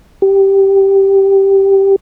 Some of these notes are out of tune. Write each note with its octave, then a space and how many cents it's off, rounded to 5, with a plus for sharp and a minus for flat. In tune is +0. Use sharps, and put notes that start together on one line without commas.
G4 -5